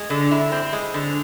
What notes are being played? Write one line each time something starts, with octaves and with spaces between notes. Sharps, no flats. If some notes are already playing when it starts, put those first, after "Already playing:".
Already playing: G#3
D3
E4
C4
G#3
D3